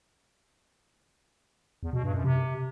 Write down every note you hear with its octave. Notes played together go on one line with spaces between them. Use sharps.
E2
B2
G2
F#2
C3